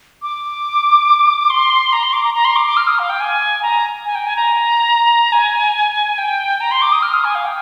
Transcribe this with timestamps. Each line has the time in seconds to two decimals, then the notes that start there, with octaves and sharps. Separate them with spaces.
0.22 D6
1.50 C6
1.93 A#5
2.03 C6
2.13 D6
2.24 A#5
2.34 A#5
2.45 C6
2.56 D6
2.66 D6
2.77 F6
2.88 D#6
2.99 F5
3.10 G5
3.20 G#5
3.63 A#5
4.05 G#5
4.15 G5
4.26 G#5
4.36 A#5
5.32 G#5
6.18 G5
6.60 A#5
6.71 C6
6.82 D6
6.92 D#6
7.02 F6
7.14 D#6
7.24 G#5
7.35 F5
7.45 G5